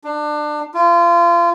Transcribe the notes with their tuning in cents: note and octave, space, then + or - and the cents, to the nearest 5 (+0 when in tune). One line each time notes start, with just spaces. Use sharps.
D4 +25
F4 -30